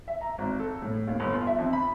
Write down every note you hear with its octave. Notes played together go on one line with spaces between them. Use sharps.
E5
A#5
G#1
A4
A2
D#2
G1
F4
E5
F2
B5